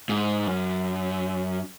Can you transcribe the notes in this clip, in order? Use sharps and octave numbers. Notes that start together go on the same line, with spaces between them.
G#2
F#2